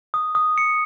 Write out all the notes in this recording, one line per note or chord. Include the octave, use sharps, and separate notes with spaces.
D#6
D#6
C#7